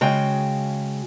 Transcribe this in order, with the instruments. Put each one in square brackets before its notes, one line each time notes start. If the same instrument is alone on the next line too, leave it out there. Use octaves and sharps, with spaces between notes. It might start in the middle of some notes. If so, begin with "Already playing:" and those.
[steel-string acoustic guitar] C#3 G#3 F#4 G5